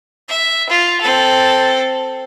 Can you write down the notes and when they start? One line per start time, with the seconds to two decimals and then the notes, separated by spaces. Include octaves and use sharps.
0.28 E5
0.69 F4
1.01 C4 A4